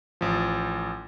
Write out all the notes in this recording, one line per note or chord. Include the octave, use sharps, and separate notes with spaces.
A1 F3